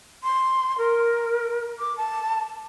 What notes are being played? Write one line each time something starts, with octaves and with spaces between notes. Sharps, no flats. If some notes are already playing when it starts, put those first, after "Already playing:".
C6
A#4
D6
A5